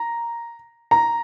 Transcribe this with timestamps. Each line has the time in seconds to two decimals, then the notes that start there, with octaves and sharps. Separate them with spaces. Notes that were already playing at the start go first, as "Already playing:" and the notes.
Already playing: A#5
0.91 A#5